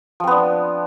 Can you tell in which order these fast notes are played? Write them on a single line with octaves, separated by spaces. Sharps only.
F3 C4 B3 D4